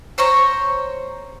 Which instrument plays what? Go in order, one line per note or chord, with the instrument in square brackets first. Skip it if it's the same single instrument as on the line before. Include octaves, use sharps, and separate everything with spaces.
[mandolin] C5 C#5 A#5 C#6